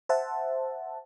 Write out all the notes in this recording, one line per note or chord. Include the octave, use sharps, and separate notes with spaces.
C5 E5 F#5 A5